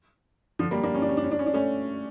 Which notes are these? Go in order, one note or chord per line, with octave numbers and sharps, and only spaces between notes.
D3 F3
G3 A#3
A#3 D4
C#4
D4
C#4
D4
C#4
D4
C#4
D4
A3 C#4